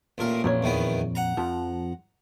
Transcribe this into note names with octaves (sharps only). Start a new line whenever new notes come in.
A1 A#2 A#4
A1 F2 A#2 C#5
E2 D#3 B3
F#5 A#5
F2 F3